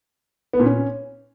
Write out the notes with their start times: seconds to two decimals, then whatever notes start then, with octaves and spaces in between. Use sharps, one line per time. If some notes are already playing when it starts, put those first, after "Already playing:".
0.53 B3
0.60 A#2
0.66 C#4